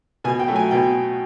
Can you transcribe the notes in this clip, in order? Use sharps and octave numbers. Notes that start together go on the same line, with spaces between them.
B2 G#5
G5
F#3 A3
G#5
B2 G5